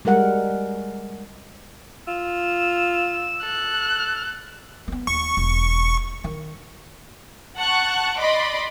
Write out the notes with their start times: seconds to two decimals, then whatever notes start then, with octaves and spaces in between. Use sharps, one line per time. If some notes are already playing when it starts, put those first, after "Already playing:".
0.05 G3 G#3 A#4 F#5
2.08 F4 E6
3.43 A4 F#6
4.88 A#3 B3
5.07 D#2 C#6
5.37 E1
6.24 D#3
7.57 F#5 A5 C#6 F#6
8.19 D5 D#5 B5 C6 D6